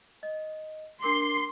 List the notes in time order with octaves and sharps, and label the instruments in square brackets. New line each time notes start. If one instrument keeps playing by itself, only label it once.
[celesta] D#5
[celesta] D4 A#4 D6 [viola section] C6